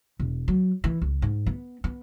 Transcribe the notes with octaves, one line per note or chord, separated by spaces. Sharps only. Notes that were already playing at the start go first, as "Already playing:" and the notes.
E1
F#3
E3
C#2
G#2
B3
B3